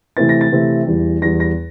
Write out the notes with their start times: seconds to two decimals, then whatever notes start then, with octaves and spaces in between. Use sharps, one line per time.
0.17 C3 E3 A3 C4 E4 A6
0.29 A#6
0.41 A6
0.52 C3 E3 A3 C4 E4
0.87 E2 E3 G3
1.22 E2 E3 G3 A#6
1.40 A#6